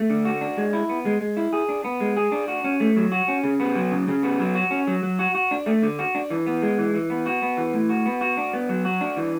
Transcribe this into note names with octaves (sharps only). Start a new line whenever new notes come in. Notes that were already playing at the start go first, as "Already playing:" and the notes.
Already playing: A3
D3
F#4
D4
G#3
E4
B3
G#3
G#3
E4
G#4
D4
B3
G#3
G#4
D4
F#4
C#4
A3
F#3
F#4
C#4
C#3
B3
F#3
C#3
C#3
B3
F#3
F#4
C#4
F#3
F#3
F#4
F#4
D4
A3
D3
F#4
D4
E3
B3
G#3
E3
E3
B3
F#4
B3
E3
A2
F#4
B3
F#4
D4
B3
F#3
F#4
D4
E3